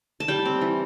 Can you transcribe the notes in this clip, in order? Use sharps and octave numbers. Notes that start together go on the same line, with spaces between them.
A5
G3 G5
C4
E3